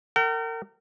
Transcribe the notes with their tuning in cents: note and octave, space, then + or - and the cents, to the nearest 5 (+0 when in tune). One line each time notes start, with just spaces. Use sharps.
A#4 -35 G5 -45